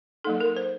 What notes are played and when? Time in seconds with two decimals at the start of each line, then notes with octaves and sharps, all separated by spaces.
0.24 F#3 A#3 D#4 A4
0.40 A#4
0.56 C5